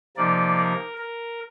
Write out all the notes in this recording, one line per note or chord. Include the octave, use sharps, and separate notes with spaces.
C3 F3 A#3 D#4 D5
A#4
A#4